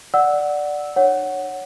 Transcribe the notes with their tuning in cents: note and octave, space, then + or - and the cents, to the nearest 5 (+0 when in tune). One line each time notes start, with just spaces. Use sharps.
D5 +0 F#5 +0 E6 -10
D#4 -40 C#5 +0 F#5 +0